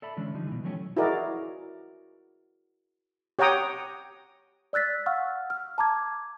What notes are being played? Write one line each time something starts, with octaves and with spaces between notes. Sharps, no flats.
A4 D5 E5 A5 B5
D3 E3 G#3 C#4 D4
D3 F3 G3 D#4
B2 E3
D#3 F3 F#3 A3 C#4 G4
E4 F#4 G#4 A#4 D5 D#5
G4 C#5 F#5 G5 A#5 D#6
D5 E6 F#6 A6 B6
F5 F#5 C#6 E6 F6
F6
A5 A#5 D6 G#6